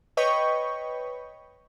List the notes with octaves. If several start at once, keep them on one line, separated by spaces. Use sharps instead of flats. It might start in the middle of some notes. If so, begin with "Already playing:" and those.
B4 C#5 D#5 G5 B5 C#6